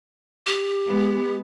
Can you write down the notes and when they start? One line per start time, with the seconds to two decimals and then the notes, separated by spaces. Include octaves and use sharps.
0.47 G4
0.88 G#3 B3